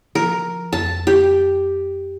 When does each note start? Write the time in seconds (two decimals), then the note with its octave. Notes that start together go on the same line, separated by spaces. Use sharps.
0.15 F3 A#4
0.73 F2 A5
1.07 G4